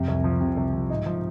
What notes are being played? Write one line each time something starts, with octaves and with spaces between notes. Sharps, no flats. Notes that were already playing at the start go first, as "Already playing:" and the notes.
Already playing: F2 C3
C2
F3
C3
C2
F3
G#2 D#4
F3